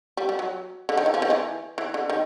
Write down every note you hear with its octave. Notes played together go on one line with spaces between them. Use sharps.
G3
G3
F#3
D3
D#3
E3
F3
D#3
E3
E3
D3
D#3